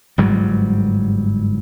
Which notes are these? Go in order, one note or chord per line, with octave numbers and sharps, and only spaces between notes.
G1 G#2 F#3 G3